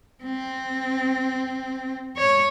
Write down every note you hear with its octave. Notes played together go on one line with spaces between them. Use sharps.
C4
C#5